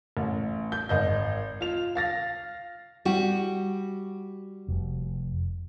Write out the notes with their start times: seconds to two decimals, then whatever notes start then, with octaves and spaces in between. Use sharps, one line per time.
0.17 A1
0.72 G6
0.89 G#1 D#5 G6
1.61 F4 F7
1.95 F5 A6 A#6
3.05 G3 F#4
4.68 F1